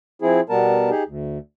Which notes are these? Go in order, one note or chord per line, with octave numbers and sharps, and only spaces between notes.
F3 C4 E4 G#4
B2 G3 B3 A#4 A5
D#4 G4 G#4
D2